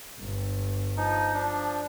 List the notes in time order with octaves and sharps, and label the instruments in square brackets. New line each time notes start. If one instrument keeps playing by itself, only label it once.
[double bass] G1
[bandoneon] F3 D#4
F3 D4